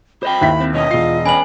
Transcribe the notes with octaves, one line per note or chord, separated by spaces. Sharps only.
C5 D#5 G5 B5
D#2 E4 B6
C4
B2 B3 C#4 D#5
E1 F4 C7
C#4 B4 G#5 F#7